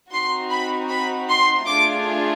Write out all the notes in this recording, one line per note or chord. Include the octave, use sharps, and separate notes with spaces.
C4 D#4 F#4 C6
B5
B5
C6
A3 D4 F4 G#4 D6